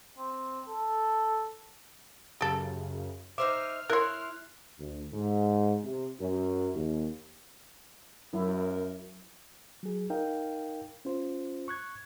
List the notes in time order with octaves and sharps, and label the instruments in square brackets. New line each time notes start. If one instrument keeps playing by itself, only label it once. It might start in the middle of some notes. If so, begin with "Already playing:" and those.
[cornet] C4
A4
[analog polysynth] F#2 C#3 [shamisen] G4 A4
[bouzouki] D#4 C5 E5 [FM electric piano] D6 [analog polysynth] F6
[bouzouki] E4 [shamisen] A#4 C#5 [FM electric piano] C6 F#6
[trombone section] D2
G#2
C3
F#2
D#2
[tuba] F#2 [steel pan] F#3 E4 [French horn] A#4
[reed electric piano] F#3 G#4
D#4 A#4 F5 G5
C#4 F4 C5
C#6 F#6 G#6